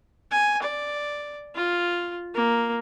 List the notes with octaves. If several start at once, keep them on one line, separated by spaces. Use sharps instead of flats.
G#5
D5
F4
A#3